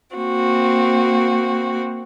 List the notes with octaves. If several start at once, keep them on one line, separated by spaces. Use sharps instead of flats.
A#3 C4 F#4